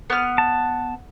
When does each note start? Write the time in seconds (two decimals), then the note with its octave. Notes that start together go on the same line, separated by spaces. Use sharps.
0.10 B3 F6
0.38 A5